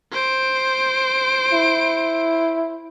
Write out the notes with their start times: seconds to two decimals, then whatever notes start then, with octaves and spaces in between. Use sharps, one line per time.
0.12 C5 D7
1.53 E4